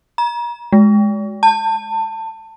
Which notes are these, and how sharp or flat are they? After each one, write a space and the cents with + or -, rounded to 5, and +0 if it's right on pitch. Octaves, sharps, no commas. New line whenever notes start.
A#5 +35
G#3 +10
A5 +25